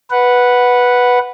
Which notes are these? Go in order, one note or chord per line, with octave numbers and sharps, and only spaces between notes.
B4 F#5